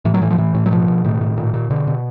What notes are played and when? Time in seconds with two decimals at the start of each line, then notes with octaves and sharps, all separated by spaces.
0.05 A2 E3
0.14 F#3
0.22 A2 E3
0.30 F3
0.38 A2 E3
0.54 A2
0.66 F#3
0.71 B2 F3
0.88 B2
1.04 A2 D#3
1.21 A2
1.37 A#2
1.54 A#2
1.70 B2 D3
1.87 B2